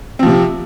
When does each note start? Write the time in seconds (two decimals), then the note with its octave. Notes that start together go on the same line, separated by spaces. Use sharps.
0.19 C4
0.23 F3
0.26 C3